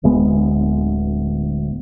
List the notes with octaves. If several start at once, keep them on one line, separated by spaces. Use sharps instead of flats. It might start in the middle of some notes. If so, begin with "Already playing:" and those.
D1 D2 G#3 B3